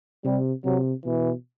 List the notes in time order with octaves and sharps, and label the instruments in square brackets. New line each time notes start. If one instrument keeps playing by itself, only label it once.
[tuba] C3 [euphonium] G3
[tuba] C3 [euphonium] F#3
[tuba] B2 [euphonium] E3